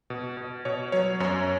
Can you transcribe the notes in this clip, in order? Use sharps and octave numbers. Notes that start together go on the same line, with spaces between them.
B2
B2
B2 C#5
F#3 C#5
F#2 C#5